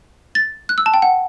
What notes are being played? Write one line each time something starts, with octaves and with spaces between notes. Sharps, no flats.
A6
F#6
E6
A5
G5
F#5